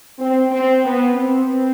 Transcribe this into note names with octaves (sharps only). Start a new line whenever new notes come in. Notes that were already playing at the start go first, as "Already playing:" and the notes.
C4
C4
B3
C4